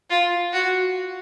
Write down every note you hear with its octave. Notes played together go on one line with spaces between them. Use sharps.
F4
F#4